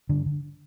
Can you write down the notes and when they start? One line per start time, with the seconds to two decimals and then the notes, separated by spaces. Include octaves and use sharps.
0.09 G2 D3
0.26 D3